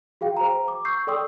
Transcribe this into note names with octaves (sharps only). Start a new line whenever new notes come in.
F#4 G#4 F5 G5
C5 A#5
D6
C#6 E6 G6 C7
A4 D5 G5 C6 D#6 E6